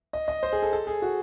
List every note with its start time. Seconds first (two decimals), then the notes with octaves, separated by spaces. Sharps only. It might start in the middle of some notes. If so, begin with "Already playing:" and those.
0.13 D#5
0.28 D#5
0.43 C5
0.53 G#4
0.63 A4
0.73 A4
0.87 G#4
1.02 F#4